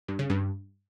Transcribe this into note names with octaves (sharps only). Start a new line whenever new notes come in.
G2
C#3
G2